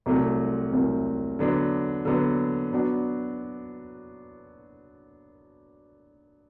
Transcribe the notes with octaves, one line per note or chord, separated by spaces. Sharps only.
C2 C3 F#3 A3 C4
C2 C3 F#3 A3 C4
D3 F#3 B3 D4
D3 F#3 B3 D4
F#3 B3 D4 F#4